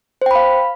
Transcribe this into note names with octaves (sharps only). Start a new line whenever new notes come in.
C5 F5 G5 B5